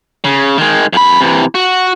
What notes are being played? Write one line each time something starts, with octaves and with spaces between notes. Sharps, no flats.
C#3
D#3 G#3
F2 B5
C3 E3
F#4